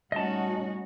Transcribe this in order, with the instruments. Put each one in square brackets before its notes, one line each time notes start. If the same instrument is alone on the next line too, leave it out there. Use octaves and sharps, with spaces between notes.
[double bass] G3 C#4 [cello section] A3 D#4 F#4 [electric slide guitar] D#5 A5